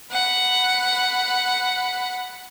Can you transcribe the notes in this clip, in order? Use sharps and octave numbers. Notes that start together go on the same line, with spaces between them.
F#5 B5